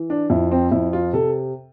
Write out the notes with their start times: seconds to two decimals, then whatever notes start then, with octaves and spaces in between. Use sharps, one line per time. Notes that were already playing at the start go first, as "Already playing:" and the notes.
Already playing: E3
0.10 D4
0.30 F2 E4
0.51 C4
0.71 F2 E4
0.93 F4
1.13 C3 A4